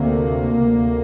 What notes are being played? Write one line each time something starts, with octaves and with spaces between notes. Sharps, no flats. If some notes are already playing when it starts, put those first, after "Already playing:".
Already playing: D2 C3 A#3
D2 C3